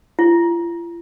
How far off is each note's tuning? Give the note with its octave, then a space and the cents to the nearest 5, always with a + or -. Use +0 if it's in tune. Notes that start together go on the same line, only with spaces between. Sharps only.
F4 -45